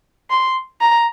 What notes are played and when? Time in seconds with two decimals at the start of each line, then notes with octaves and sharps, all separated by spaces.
0.30 C6
0.81 A#5